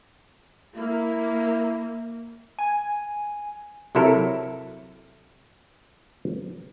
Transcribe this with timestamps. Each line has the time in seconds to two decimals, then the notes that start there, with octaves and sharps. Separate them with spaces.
0.76 A#3 E4
2.59 G#5
3.95 C3 F#3 E4 A4 A#4